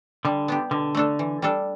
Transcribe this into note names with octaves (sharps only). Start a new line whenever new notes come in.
D3 G3
B3 D4 G4
B2 D3
A3 D4 A4
E3
G3 D4 A4